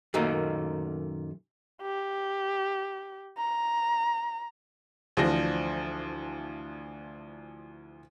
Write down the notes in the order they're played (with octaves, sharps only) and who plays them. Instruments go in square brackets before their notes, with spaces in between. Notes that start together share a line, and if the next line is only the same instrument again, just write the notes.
[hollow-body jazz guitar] F#2 A#2 D#3 A3 A#3
[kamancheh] G4
A#5
[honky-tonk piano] D2 E3 F3 D4 C5 A#6